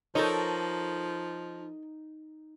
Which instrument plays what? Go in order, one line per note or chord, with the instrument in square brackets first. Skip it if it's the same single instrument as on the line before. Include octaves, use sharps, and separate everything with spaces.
[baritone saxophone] F3 [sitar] D#4 [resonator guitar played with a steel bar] A4 A#4 C#5